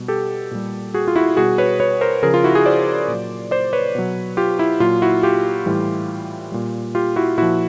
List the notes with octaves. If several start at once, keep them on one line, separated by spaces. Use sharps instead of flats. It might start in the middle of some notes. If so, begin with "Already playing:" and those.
Already playing: B2 G3
G4 A4
A#2 G3
F#4 G#4
F4
E4 F#4
B2 G3 F#4 G#4
B4 C#5
B4 C#5
A#4 C5
C#3 F3 G#4 A#4
F4
E4 F#4
F#4 G#4
C5 D5
A#2 F#3
C5 D5
B4 C#5
B2 F#3
F4 G4
E4
A#2 F#3 F4
E4 F#4
F4 G4
A2 E3 G3
A#2 G3
F4 G4
E4 F#4
A#2 F3 E4 F#4